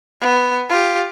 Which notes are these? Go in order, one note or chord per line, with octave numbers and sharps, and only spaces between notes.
B3
F4 G4